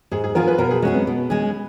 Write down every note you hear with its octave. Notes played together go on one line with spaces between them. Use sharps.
G#2 G#4
G#4
F3 B3 F4 G#4 A#4
B4
B2 A#4
G#4
G#3 C#4 F#4 G#4
B3
B2
G#3 C#4 G#4